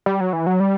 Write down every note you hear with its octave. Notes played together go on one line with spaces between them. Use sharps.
G3
F#3
E3
F#3
G3